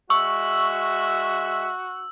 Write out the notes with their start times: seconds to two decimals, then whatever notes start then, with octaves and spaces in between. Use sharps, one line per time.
0.10 G#3 F#4 E5 C#6 E6